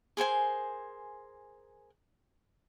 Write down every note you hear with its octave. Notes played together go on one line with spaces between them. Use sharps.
G#4 A#4 C5 G#5